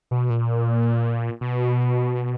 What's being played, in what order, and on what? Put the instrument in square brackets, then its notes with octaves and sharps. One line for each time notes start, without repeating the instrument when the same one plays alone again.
[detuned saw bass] B2
A#2
B2